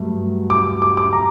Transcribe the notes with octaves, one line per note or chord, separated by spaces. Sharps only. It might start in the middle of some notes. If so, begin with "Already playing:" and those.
Already playing: G2 F#3 A3
D6
D6
D6
A#5